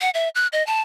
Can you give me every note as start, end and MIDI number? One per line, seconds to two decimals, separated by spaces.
0.01 0.10 78
0.14 0.29 76
0.35 0.47 90
0.52 0.65 75
0.67 0.82 81